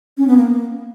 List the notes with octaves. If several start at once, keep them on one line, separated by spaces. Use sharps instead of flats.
C#4
B3
A#3